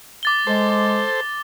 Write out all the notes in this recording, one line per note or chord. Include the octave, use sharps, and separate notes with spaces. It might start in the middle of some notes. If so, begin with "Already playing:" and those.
D6 A6 G7
G#3 A4 C5